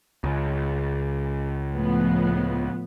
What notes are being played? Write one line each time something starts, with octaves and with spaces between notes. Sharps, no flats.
C#2
A2 F3 B3